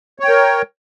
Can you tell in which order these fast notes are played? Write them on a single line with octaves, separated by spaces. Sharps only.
C#5 G5 A#4